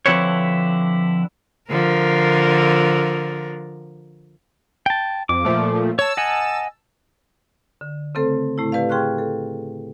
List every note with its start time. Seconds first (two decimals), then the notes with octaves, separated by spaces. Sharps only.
0.06 D3 F3 C4 E4 B4 C#5
1.70 D3 F3 A#4
4.86 G5 A5
5.29 F2 D6
5.45 A#2 F3 A3
5.99 C#5 A5 E6
6.17 D#5 F#5 G#5
7.81 D3
8.15 C#3 A3 C4 A4 C5
8.58 A2 A3 E4
8.72 G4 B4 D5 F5
8.89 G#4 G5 C6 C#6 F6 F#6
9.18 A4